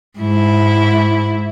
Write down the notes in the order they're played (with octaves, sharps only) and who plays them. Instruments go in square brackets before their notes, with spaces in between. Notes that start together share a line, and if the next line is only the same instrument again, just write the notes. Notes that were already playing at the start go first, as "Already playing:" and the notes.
[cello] G#2 E4